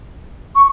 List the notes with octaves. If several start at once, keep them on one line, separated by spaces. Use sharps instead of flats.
C#6